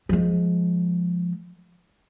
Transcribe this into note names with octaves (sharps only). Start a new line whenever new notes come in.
F3 G#3